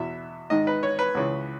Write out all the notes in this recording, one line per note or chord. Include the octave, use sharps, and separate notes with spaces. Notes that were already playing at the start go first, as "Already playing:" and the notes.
Already playing: E2 B2 E5
G#2 D#3 D#5
B4
C#5
B4
C#2 C#3 E3